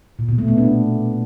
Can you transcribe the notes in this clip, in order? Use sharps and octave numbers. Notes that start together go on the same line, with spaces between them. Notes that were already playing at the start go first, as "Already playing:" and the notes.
A#2
B2
A3
B3
D4